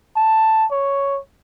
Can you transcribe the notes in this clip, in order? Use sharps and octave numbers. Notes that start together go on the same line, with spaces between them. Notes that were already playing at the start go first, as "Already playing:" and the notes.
A5
C#5